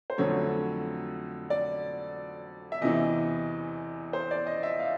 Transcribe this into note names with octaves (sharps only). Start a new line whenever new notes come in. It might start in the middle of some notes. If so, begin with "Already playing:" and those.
C5
F2 D3 F#3 A3 C#5
D5
E5
E2 C3 E3 D#5
C5
D5
D#5
E5
F5